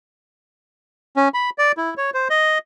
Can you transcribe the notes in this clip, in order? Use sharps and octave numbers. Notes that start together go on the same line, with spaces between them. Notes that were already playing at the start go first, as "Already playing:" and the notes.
C#4
B5
D5
E4
C#5
C5
D#5